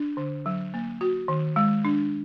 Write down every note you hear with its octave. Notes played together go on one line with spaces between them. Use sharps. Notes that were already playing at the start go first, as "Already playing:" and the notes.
Already playing: D4
D3
F#3
A#3
F#4
D#3
G#3
D4